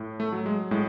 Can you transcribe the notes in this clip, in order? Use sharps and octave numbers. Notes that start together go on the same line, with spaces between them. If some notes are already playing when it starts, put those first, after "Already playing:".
Already playing: A2
A3
F#3
G#3
A2 G#3